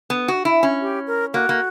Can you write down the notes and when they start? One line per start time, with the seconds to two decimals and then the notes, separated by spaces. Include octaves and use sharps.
0.10 B3
0.28 F#4
0.45 E4
0.63 C#4
0.81 G4
1.07 A#4
1.34 A#3 F#4
1.49 A#3